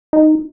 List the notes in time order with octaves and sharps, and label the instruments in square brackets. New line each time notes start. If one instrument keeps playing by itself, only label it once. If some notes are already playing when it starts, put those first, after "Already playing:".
[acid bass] D#4